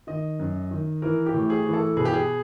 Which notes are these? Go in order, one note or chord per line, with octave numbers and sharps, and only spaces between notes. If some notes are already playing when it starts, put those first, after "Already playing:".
D#3 D#5
F#2
D#3
E3 A#4
G4
A2
G#4
E3
A4
B2 G#4
G4
G#4